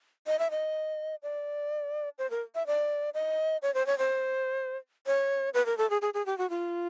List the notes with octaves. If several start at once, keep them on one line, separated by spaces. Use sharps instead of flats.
D#5
E5
D#5
D5
C5
A#4
E5
D5
D#5
C#5
C5
C#5
C5
C#5
B4
A#4
A4
G#4
G#4
G#4
G4
F#4
F4